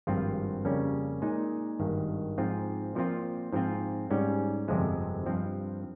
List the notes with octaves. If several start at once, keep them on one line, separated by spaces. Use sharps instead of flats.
G#1 G2 F3 C4 F4
F2 C#3 G3 A#3 C#4
A#2 G#3 D#4
G#1 G2 D#3
G#2 F3 C4 F4
A#2 F3 C4 F4
G#2 F3 C4 F4
G#2 G3 C#4
G1 F2 C3 F3 G#3
G2 F3 C4